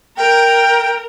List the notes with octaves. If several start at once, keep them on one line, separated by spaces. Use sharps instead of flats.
A#4 G5